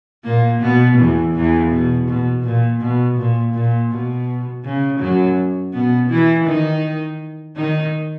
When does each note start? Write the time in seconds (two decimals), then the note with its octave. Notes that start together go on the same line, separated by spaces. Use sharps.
0.25 A#2 A#3
0.62 B2 B3
0.98 E2 E3
1.35 E2 E3
1.71 B2
2.09 B2
2.44 A#2
2.81 B2
3.18 A#2
3.54 A#2
3.92 B2
4.65 C#3
5.00 F#2 F#3
5.74 B2 B3
6.10 E3 E4
6.47 D#3 D#4
7.56 D#3 D#4